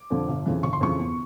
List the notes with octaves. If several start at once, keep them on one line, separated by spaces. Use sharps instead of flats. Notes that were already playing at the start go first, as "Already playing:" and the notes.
Already playing: D6
F2 D3 F3
G1
F2 C#3 E3
G1 C#6
C6
F2 C#3 E3 C#6
E2